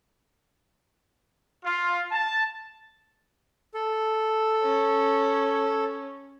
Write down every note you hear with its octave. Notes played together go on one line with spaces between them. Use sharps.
F4
A5
A4
C#4